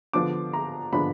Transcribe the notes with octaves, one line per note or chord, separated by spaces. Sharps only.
D3 F3 B3 D4 D6
A#5
D3 F3 B3 D4 B5